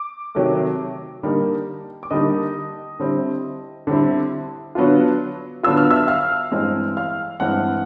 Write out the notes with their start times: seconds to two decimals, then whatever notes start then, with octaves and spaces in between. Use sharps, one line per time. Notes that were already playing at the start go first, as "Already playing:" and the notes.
Already playing: D6
0.35 C3 D#3 F#3 A3
1.23 D3 G3 A#3 D#4
2.03 D6
2.11 D3 G3 A#3 D#4 D#5 D#6
2.99 D3 G3 C4 E4
3.87 D3 G3 C4 E4
4.75 D3 F#3 B3 D4 F4
5.63 D3 F#3 B3 D4 F4 E6
5.77 F6
5.91 E5 E6
6.08 F5 F6
6.52 G2 E3 G#3 C4
6.97 F5 F6
7.40 G2 E3 G#3 C4 F#5 F#6